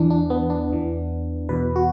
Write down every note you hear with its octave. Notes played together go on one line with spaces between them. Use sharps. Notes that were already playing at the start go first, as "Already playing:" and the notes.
Already playing: E2 E3 D4
D4
B3
D4
E2 E3
E2 B2 B4
F#4